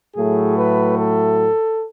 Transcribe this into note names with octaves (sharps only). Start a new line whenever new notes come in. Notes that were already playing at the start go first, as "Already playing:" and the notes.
A2 F#3 A3 G#4
B4
A4